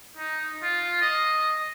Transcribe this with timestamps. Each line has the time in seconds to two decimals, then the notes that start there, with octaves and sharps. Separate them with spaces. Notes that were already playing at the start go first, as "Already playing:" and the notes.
0.17 D#4
0.62 F4
1.02 D#5